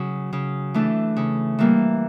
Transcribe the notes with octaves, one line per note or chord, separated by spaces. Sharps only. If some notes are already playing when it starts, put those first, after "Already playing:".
Already playing: C#3 F#3
C#3
E3 A3 D4
C#3
E3 G3 A#3